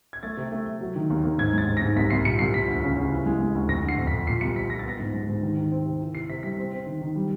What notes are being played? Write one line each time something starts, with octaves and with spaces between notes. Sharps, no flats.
G#6
A3 A6
C3
A3
A3
F#3
D#3
D#2
D#2
G#2 G#6
G#3 A6
G#2
A#6
G#2
C2 B6
C2 C7
A#2 C#7
C2 C7
F3 B6
D2
C#3
C#3
E3
G#3
G#3
D2
F2 A#6
D3 C7
F2
B6
F2
A#2 C7
C2 C#7
F3 B6
F3 A#6
A6
B3 A#6
G#2
G#3
G#2
D#3
D#3
C4
C3
E3
C3 C7
C3 B6
G3 B6
C4
C4
D#3
D#3
G3